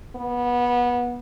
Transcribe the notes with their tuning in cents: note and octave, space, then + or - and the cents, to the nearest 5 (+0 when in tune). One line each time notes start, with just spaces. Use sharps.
B3 -20